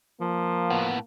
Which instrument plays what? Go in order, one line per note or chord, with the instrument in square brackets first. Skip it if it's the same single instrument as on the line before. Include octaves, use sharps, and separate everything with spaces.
[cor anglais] F3 [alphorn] A#3
[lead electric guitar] A2 B3